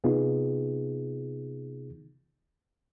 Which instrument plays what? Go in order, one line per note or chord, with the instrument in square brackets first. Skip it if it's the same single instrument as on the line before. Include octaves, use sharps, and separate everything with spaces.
[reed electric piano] C3 B3 D#4 F4 G#4